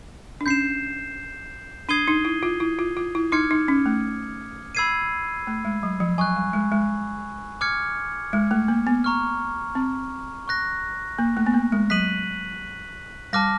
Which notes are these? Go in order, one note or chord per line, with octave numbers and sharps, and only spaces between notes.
D4
C#4 G6 C7 E7
D4 D#6 G#6 C7 D#7 G7
D#4
E4
F4
E4
F4
F4
E4
D#4 D6 F6 G#6 C#7
D#4
C#4
A3
B5 E6 G#6 C7 D#7
A3
G#3
F#3
F3
F#3 G#5 C#6 F#6
G3
G#3
G#3
D6 F6 G#6 C#7
G#3
A3
A#3
B3
A#5 C#6 F6
C4
C#6 F#6 A#6
A#3
A3
B3
A#3
G#3
F#3 F#6 B6 D#7 F#7
G3 A5 D6 F6 A#6